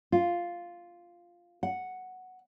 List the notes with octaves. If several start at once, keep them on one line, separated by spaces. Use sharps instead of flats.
F4
F#5